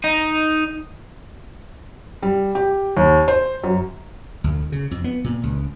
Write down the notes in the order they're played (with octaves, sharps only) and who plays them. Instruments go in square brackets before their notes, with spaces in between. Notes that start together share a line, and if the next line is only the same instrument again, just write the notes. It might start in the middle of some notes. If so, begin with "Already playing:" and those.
[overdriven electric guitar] D#4
[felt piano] G3
G4
D#2
C5
F#2
[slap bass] D2
C#3
F2
B3
A#2
C#2